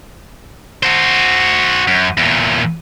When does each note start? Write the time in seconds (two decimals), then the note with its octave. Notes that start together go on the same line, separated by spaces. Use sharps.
0.83 F#4 C5
1.87 F#2
2.18 E2 A#2